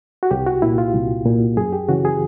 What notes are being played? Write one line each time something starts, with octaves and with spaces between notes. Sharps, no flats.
F#4
C2 G4
F#4
A#2 E4
F4
C2
A#2
F#2 G#4
G4
C#3 E3 F#4
G#4